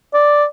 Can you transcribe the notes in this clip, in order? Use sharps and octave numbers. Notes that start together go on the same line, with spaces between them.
D5